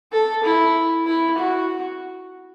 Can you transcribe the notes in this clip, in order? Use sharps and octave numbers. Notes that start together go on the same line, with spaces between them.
A4
E4
E4
F#4